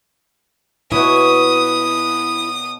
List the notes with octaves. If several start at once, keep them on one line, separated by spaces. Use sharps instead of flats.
B2 E4 C#5 D#6